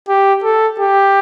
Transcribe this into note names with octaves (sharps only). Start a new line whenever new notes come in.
G4
A4
G4